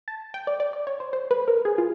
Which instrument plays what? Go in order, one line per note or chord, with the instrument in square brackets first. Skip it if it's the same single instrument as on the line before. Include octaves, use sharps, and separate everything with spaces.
[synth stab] A5
G5
D5
D5
D5
C#5
C5
C5
B4
A#4
G#4
F4